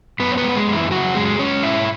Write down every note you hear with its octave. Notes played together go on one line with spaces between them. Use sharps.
F#2 B3 B4
C#5
B3 B4
G#3
G#3 G#4
F#2
E3 E4
C#3 F#3 F#4
F#2 G#3 G#4
G#3 C#4 C#5
G#2 E4 E5